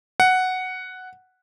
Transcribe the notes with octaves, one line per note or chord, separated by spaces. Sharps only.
F#5